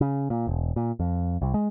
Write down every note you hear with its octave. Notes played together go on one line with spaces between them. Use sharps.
C#3
A#2
E1
A#2
F2
C2
G#3